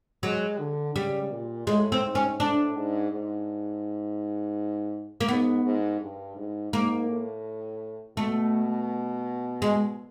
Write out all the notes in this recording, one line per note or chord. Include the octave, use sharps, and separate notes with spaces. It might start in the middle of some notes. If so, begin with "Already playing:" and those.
F#3 G#3
D3
C#3 G3
A#2
A2 G#3
C4
G#2
C#4
A2 D4
G#2
G#2
A#3
G#2 B3
G#2
G2
G#2
G#2 A#3
A2
B2 A3
G#3